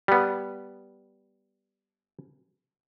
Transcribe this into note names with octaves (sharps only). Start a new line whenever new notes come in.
G3 B3